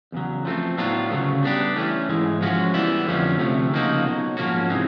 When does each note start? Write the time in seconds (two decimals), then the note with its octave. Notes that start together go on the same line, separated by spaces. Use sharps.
0.12 E2 C#3 F#3
0.45 F3 A3 C4
0.77 A2 F#3 B3 D4 F4
1.11 D2 C#3 F#3 A3
1.43 G3 B3 D4 G4
1.76 E3 A3 C#4
2.08 G#2 E3 G#3
2.41 F3 G#3 C#4 F#4
2.74 E3 G3 B3 E4
3.06 F2 D3 F3 A3 C#4
3.39 D2 C3 F3 A3
3.71 C#3 F3 A#3 D#4 F#4
4.04 B1 B2 F#3
4.37 G#2 F3 A#3 C#4 F#4
4.69 C3 E3 G#3 C4 D#4